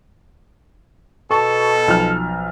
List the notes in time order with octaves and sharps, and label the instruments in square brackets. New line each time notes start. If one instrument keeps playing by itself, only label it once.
[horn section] B2 A4 [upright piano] A5 C#6
[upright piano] B1 F3 F6